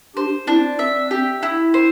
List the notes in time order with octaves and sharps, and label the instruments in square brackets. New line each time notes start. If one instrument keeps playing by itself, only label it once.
[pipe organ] D4 G4 [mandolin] C5
[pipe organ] C4 E4 [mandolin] D4
[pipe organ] C4 [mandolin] E5
[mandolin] G4
E4
C5